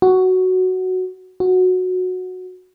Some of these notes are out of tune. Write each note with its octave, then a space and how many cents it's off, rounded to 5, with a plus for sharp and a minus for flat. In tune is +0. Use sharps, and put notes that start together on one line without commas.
F#4 +5
F#4 -10